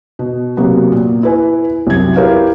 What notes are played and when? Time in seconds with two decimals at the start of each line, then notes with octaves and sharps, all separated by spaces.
0.19 B2
0.57 C3 F#3 A#3 B3
0.92 A#2
1.23 E4 B4 G#5
1.87 C2 F#2 G#6
2.16 E4 G4 A#4 B4 C#5 F5